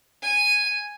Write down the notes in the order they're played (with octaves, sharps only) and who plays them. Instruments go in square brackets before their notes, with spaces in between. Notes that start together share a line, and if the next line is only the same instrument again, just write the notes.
[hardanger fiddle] G#5